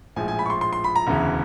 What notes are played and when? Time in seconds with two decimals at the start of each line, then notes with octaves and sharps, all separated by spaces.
0.16 A#1 A2 F3 G#3 G#5
0.28 G#5
0.39 B5
0.46 C#6
0.50 C6
0.61 C6
0.73 C6
0.84 B5
0.96 A#5
1.07 E1 D2 C#3 E3